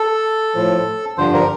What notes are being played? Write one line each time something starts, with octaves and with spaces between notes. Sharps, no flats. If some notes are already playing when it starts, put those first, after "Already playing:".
Already playing: A4
A2 F3
G2 D3 F3 C5
A#4